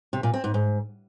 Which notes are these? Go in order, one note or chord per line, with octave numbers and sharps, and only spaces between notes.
C3
A#2
C4
G#2
G#2